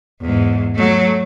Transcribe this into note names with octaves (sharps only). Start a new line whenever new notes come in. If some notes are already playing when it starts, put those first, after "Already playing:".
E2 G#2
F#3 A3